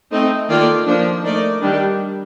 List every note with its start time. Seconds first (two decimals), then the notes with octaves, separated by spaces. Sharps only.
0.12 A3 C4 D#4
0.49 D#3 A#3 F4 A4 D5
0.87 F3 A#3 D4
1.24 A3 D#4 A#4 D5
1.62 D#3 G3 D4